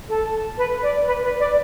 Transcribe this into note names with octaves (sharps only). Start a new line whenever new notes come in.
A4
B4
D5
B4
B4
D5